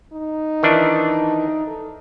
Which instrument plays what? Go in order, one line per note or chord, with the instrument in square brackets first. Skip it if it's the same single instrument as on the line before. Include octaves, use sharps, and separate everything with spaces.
[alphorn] D#4
[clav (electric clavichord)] D#3 E3 D4
[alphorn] A4